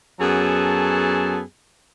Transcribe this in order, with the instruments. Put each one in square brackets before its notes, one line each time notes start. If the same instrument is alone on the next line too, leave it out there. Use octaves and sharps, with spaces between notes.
[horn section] F#2 F#3 B3 G#4 A4 A5